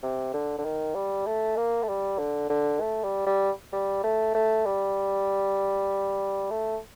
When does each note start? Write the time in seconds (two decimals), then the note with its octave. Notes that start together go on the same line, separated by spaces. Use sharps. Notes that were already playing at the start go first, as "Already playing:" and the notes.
0.03 C3
0.34 D3
0.58 D3
0.65 D#3
0.95 G3
1.26 A3
1.57 A#3
1.83 A3
1.88 G3
2.19 D3
2.50 D3
2.81 A3
3.03 G3
3.27 G3
3.73 G3
4.04 A3
4.35 A3
4.66 G3
6.51 A3